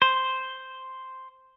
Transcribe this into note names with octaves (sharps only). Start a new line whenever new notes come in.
C5